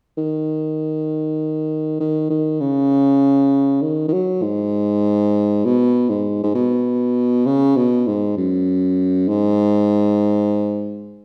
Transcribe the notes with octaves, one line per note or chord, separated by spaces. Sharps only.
D#3
D#3
D#3
C#3
D#3
D#3
F#3
G#2
B2
G#2
G#2
B2
C#3
B2
G#2
F#2
G#2